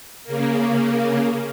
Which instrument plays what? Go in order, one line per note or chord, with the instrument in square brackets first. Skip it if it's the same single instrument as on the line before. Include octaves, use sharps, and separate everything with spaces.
[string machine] C#3 A#3